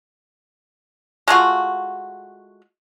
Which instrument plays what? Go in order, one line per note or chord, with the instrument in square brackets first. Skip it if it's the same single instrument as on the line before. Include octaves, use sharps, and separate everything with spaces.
[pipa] G#3 A3 F4 F#4